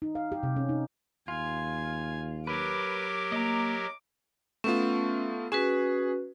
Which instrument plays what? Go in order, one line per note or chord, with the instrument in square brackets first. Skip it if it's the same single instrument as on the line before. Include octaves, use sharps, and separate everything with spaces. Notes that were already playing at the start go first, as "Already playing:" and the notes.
[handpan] D#4
F5
G4
C3
C#4
D#4
[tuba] D#2 [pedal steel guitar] F4 [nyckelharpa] G#5
[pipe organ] F#3 G4 A#4 [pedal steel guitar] B4 [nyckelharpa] D6
[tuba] A#3 [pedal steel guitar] D#5 A#5
[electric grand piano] A3 B3 F4 [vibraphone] C#4
[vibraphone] C#4 F#4 B4 [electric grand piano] G#4